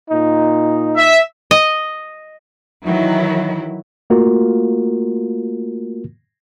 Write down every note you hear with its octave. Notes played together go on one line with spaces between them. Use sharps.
A#2 D#4
E5
D#5
D#3 E3 F#3 E4
A3 A#3 F4 F#4 A#4